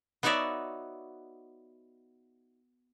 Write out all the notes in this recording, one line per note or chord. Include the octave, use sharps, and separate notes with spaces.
B3 D#4 F#4 C#5 D5 E5